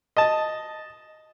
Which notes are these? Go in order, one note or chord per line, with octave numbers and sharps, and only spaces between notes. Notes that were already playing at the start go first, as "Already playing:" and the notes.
D#5 A5